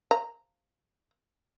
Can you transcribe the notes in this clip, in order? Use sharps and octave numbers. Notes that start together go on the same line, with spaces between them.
A#5